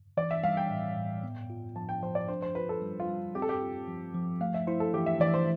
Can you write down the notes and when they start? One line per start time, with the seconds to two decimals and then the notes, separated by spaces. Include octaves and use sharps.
0.17 E3 D5
0.31 E5
0.43 G3 F5
0.57 G5
0.70 A2
0.97 A2
1.24 B3
1.50 F4
1.76 F3 A5
1.89 G5
2.02 F3 C5
2.15 D5
2.28 D4 C5
2.42 C5
2.55 F4 B4
2.69 A4
2.82 G3
3.00 F4
3.09 G3
3.35 C4 G4
3.42 A4
3.49 G4
3.62 F4
3.88 F3
4.14 F3
4.41 A3 F5
4.54 E5
4.67 E4 C5
4.80 A4
4.94 E3 G4
5.06 E5
5.20 E3 D5
5.34 C5